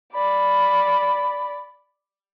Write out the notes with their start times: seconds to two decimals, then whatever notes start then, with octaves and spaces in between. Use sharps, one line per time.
0.13 D5 B5